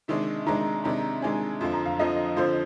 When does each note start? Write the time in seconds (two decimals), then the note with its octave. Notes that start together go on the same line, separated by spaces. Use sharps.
0.08 C3 D#3 G#3 D4
0.46 C3 D#3 G#3 D4 A#5
0.84 C3 D#3 G#3 D4 A#5
1.22 C3 D#3 G#3 D4 G#5
1.61 F2 D3 F3 C6
1.73 A#5
1.86 F5
1.99 F2 D3 F3 D#5
2.37 F2 D3 F3 C5